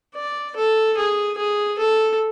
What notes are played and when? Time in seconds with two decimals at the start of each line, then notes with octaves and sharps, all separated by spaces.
0.15 D5
0.56 A4
0.97 G#4
1.37 G#4
1.78 A4